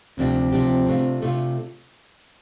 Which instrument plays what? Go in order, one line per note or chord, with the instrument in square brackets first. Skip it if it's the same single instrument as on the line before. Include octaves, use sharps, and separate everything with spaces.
[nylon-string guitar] D2 C3 F3 D4 G4 [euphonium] C4
[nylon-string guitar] D2 C3 F3 D4 G4
C3 A3 D4 F4
C3 A3 D4 F4